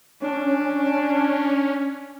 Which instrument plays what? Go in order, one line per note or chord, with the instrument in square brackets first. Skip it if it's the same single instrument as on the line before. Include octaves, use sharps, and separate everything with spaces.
[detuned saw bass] C#4 [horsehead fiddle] D4